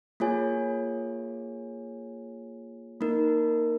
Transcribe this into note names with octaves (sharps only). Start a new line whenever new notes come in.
A#3 F4 G#4 C#5 G#5
A#3 D#4 A#4